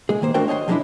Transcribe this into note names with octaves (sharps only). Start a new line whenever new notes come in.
G#3 G#4
D#3 A#3 C5
A3 D4 F#4 A#4 C5 G5
C#5 D#5 G5 C6
F3 F#3 G#3 A#3 D4 E4